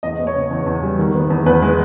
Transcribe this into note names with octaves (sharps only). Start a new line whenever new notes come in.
E2 D#5
B3
C#5
C#3
E2
E2
G3
D#3
B3
E2
E2 B4
G#3